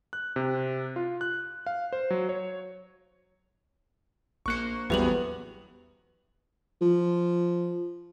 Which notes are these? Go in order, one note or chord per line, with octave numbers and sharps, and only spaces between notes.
F#6
C3
F4
F#6
F5
C5
F#3
C#5
A#1 A#3 C5 C#6 F#6 C#7
A1 E2 F#3 G3 B3 B4 F7 F#7
F3